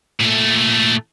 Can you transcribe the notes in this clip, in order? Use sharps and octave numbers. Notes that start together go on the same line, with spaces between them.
A#2 A3